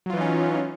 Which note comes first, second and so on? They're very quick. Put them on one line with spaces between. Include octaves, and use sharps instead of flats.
F#3 F4 E3 D#4 C#4